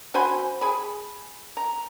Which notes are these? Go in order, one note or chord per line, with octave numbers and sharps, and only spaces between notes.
F#4 C5 G#5 B5
G#4 G#5 B5
A#5